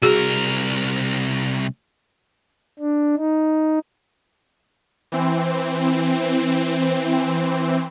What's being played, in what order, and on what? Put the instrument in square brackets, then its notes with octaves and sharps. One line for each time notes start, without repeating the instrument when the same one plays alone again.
[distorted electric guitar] C2 A#4 [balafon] F#4 G#4
[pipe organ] D4
D#4
[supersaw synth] E3 C4